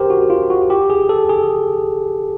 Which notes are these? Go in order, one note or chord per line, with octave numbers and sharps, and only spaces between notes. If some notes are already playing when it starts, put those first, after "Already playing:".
Already playing: G4 A#4 C5
F#4
F4
F#4
G4
G#4
A4
G#4